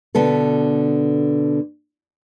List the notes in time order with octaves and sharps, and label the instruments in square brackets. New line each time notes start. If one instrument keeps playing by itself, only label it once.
[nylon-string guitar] B2 D3 B3 A4